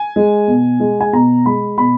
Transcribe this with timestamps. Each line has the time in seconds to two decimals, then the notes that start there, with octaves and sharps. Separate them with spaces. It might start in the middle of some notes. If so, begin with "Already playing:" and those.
Already playing: G#5
0.16 G#3
0.48 B2
0.80 G#3
1.01 G#5
1.13 B2 A#5
1.46 G#3 B5
1.77 B2 B5